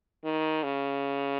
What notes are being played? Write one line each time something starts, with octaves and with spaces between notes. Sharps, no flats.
D#3
C#3